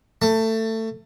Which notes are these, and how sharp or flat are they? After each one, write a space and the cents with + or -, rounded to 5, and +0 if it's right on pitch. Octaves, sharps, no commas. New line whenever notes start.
A3 +20 A5 +25